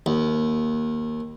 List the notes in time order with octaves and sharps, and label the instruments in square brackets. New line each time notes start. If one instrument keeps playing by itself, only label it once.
[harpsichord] D#2